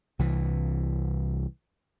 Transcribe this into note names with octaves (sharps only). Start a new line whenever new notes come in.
C2 E3